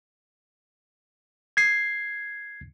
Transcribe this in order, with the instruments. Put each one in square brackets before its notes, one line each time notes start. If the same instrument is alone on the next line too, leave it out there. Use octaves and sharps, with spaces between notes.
[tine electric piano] G#6 C7